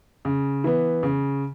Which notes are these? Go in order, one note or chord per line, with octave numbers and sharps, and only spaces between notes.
C#3
E3 B3
C#3